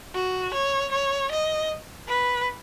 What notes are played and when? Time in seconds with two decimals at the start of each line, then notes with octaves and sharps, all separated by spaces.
0.14 F#4
0.54 C#5
0.92 C#5
1.31 D#5
2.08 B4